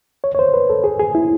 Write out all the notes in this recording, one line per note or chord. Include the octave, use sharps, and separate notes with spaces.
C#5
C#5
C5
B4
A4
G#4
G#4
E4